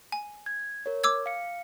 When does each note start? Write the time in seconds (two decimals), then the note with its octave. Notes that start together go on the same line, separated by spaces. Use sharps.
0.12 G#5
0.46 G#6
0.86 A#4 C#5
1.04 D6 E6 G#6
1.26 F5 C#7